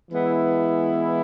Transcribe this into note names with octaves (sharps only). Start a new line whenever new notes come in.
E3 G#3 B3 E4